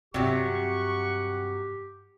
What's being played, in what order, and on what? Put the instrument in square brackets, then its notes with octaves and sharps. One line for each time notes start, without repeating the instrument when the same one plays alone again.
[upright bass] G2 [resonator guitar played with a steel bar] C3 F#3 [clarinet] G4 [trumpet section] F#5 C#6